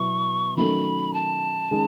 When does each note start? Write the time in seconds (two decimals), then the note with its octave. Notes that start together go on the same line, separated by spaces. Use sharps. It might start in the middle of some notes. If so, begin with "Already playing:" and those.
Already playing: B2 F#3 B3 E4 C#6
0.57 D#3 F#3 A3 C#4 B5
1.14 A5
1.71 D#3 G#3 C#4